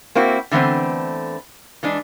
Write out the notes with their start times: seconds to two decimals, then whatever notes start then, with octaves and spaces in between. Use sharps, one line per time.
0.15 A#3 C4 E4 F#4
0.51 D3 E3 A3 B3 C4
1.83 E3 G#3 D4